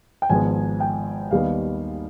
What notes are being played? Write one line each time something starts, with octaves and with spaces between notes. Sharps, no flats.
G5
G#1 G#2 F3 B3 G#5
G5
D#2 D#3 G3 B3 F5